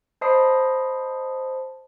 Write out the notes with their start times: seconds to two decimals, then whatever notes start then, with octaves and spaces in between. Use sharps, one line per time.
0.21 C5 D#5 A5 B5 D#6 C7